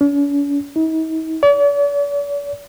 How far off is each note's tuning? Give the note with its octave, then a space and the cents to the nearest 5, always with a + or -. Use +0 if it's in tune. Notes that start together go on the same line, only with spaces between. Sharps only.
C#4 +45
D#4 +45
D5 -45